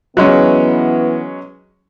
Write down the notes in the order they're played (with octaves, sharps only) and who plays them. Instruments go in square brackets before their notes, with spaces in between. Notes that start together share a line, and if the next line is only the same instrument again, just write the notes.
[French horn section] E3 B3 [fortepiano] F#3 G#3 C#4